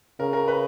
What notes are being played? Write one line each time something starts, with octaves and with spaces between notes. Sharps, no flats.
C#3 A#4
A#4
B4